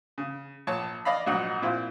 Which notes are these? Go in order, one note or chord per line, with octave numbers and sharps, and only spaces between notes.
C#3
A#1 C#5 A5
D5 D#5 F5 B5
A#1 G#2 F#3 D#4 F#5 D#6
A#2 C4 E4 F4